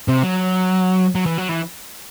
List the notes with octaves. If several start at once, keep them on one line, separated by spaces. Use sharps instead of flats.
C3
F#3
F#3
E3
F#3
E3